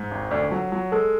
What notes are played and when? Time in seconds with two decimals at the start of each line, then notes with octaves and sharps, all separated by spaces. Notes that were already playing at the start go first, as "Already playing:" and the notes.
Already playing: G#2
0.11 G#1
0.31 D2 D5
0.51 F#3
0.72 F#3
0.92 G#3 A4